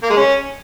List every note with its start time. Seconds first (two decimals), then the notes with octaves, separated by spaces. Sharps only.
0.03 A#3
0.10 G#3
0.17 C#4